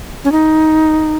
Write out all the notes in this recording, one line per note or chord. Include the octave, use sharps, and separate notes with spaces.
C#4
D#4